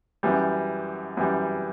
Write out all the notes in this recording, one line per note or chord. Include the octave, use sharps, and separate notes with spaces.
F#2 E3 G3
F#2 E3 G3